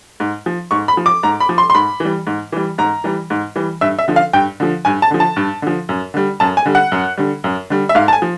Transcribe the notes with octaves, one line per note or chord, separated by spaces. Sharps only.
G#2
F3
G#2 C#6
B5
F3
D6
G#2 A#5
B5
F3
C6
C6
G#2 B5
E3 G3
G#2
E3 G3
G#2 A#5
E3 G3
G#2
E3 G3
G2 E5
E5
D3 F3
F5
G2 G5
D3 F3
G2 G#5
A5
D3 F3
A5
G2
D3 F3
F#2
D3 G3
F#2 A5
G#5
D3 G3
F#5
F#2
D3 G3
F#2
D3 G3
E5
G#2 F5
A5
G#5
F3